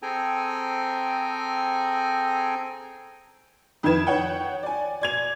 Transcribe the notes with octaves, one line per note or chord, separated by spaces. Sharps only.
C4 G#4 A4 G5 G#5 A#5
F2 D#3 E4 B4 G#6 E7
C#5 F#5 G5
D5 G#5
D5 G#6 F7